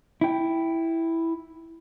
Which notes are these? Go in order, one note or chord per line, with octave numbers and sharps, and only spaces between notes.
E4 G5